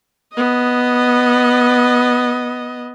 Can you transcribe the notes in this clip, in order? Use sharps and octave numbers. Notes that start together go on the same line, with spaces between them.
B3 D#5